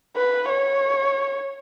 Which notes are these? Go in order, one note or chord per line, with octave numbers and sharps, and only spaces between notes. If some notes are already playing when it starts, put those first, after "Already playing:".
B4
C#5